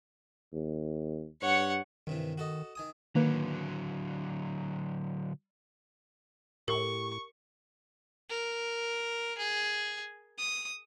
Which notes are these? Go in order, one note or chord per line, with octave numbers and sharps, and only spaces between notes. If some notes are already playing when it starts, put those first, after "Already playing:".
D#2
G2 C#5 F#5
G2 C3 D#3 E3
F#4 A4 D#5
D#3 G#5 D#6
D3 D#3 F#3 A#3 B4
A2 G4 A#4 C#6
A#4
G#4
D#6